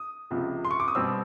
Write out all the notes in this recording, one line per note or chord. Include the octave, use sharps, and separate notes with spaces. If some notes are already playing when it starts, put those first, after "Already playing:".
Already playing: D#6
C#2 C3 F3
C6
C#6
D6
D#6
B2 G3 C4 E6